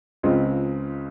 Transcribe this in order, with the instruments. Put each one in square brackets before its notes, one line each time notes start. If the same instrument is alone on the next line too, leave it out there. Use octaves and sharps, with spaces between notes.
[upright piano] C#2 C#3 G#3 C4 F4